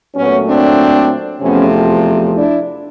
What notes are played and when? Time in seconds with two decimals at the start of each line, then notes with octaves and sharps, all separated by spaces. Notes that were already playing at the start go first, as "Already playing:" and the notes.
0.15 A#2 F#3 A3 B3 C#4
0.47 C4 D4
1.41 E2 C3 F3 A3 B3 C#4
1.74 C4
2.37 D4 E4